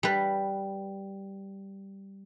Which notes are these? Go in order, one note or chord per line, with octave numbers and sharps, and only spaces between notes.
G3 B4